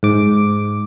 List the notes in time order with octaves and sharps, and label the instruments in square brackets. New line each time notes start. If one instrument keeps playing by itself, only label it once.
[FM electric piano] G#2 D6